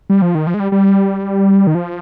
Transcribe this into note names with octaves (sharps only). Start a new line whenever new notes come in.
G3
F3
D#3
F3
G#3
G3
G3
D#3
F3